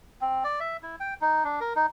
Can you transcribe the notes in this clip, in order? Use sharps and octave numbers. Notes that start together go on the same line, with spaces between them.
C4
D5
E5
E4
G5
D#4
D4
A#4
D#4